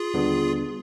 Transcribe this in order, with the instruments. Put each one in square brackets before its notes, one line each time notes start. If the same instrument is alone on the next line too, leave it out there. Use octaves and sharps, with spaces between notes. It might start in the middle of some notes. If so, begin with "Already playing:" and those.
Already playing: [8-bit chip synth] F4 G#4
[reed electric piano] D#2 D3 G3 B3 D4